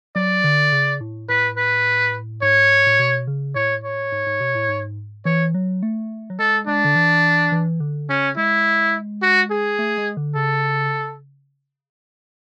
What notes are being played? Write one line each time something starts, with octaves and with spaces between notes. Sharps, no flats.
F#3 D5
D3
C#3
A2
A2 B4
B4
G#2 C#5
A2
B2
C#3
A2 C#5
C#5
G#2
G#2
B2
A2
G#2
E3 C#5
F#3
A3
F#3
G#3 A4
G#3 D4
D3
E3
E3
D3
C#3 C#4
G#3 E4
F#4
G#4
A3
G#3
D3
C#3 A4